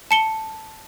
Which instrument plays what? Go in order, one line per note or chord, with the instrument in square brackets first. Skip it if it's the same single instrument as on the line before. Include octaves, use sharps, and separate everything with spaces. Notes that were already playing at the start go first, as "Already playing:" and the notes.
[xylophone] A5 C#7 G7